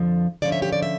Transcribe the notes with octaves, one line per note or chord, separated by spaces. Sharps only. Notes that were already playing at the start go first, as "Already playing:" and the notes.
Already playing: F2 D3 F3
D3 F3 C#4 D5
E5
G4
D5
E5